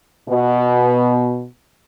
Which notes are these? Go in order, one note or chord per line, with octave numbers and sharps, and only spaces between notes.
B2